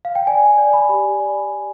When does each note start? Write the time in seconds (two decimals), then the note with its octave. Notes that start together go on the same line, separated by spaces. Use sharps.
0.05 F5
0.15 G5
0.27 D5 G#5
0.58 D5
0.73 B5
0.89 G4
1.20 D5 B5
1.51 D5